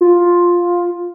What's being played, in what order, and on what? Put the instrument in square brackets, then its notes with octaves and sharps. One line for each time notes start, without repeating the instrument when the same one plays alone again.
[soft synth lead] F4